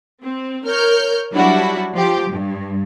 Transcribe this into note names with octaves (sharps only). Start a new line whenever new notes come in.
C4
A#4 C#5 F6 G6
F#3 G3 D4 E4 F#4
F3 G4
G2